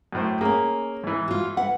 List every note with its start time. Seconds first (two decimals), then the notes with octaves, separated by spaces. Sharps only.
0.13 F#2 A2 C5
0.41 A#3 C#4 G#4
1.03 G#2 E3
1.28 F4 F#4
1.57 B4 F#5